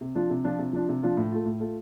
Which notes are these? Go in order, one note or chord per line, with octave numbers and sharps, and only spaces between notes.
C3
F3 D4 F4
C3
F3 D4 F4
C3
F3 D4 F4
C3
F3 D4 F4
A2
A3 F4
A2
A3 F4